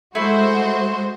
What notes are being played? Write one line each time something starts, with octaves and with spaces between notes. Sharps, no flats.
G#3 A3 E4 F#4 C5 C6